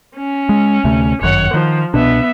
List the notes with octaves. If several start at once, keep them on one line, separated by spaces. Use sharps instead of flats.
C#4
G#3
D2 C3 A3
G1 F#2 D#3 C#5 F#5
D#3 F3
C2 B2 B3 D4 E5